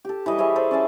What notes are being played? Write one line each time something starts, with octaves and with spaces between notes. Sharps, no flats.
G4 A4
E3 G3 D#5
E4 G#4 C#5 E5
G#4 A4 C5 D5
C#4 D5 E5 A5